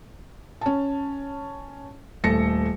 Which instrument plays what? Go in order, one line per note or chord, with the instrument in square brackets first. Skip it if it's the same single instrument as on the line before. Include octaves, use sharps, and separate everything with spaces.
[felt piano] C#4 A5
D#1 A3 A4 A#6 C#7